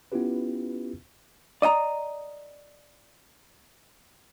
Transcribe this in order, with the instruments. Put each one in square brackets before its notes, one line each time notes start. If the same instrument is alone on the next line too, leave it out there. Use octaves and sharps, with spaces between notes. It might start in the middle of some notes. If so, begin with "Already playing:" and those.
[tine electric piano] B3 C#4 E4 F4 G4 B4
[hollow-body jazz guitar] D5 D#5 F#5 A#5